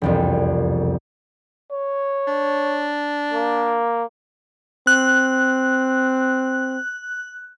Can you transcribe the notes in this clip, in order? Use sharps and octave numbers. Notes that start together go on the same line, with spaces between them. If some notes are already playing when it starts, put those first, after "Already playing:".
E1 C2 F2
C#5
D4
A#3
C4 F#6